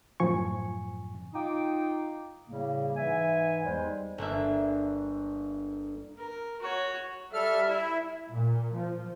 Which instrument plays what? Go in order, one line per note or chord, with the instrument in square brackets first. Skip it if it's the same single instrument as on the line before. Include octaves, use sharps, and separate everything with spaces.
[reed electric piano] F#2 A2 F3 G#5 C#6
[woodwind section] D#4 F4 G5 D6 D#6
A2 C#3 G3 A#3
G#2 E3 E5 G#5
E2 G3 G#3 D#4 C5
[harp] G1 A#3 D4 E5
[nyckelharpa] A#4
F#4 C#5
[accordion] G3 A4 F6 [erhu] E5
[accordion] E4
[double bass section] A#2
F3